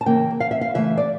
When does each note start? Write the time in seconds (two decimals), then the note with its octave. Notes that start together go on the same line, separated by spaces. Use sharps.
0.01 A5
0.06 C#3 E3 A#3 G5
0.40 F5
0.51 E5
0.61 F5
0.74 C#3 E3 A3 E5
0.97 D5